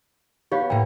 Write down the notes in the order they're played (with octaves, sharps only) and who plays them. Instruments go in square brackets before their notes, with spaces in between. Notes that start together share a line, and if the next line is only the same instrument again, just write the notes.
[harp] B3 [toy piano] G4 C#5 F5
[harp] A2 A#3 [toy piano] G5